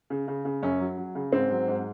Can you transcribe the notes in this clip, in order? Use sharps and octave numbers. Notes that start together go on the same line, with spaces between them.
C#3
C#3
C#3
F#2 C#4
F#3
F#3
C#3
G#2 C4
F#3
G#2